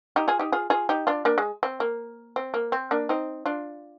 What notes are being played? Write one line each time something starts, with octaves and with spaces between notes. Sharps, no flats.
D#4 G4
F4 G#4
D#4 G4
F4 G#4
F4 G#4
D#4 G4
D4 F4
A#3 D4
G#3
C4
A#3
C4
A#3
C4
A#3 D4
C4 D#4
D4 F4